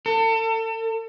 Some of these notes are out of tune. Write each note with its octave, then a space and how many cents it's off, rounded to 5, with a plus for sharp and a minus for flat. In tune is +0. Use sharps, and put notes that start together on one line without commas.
A4 +35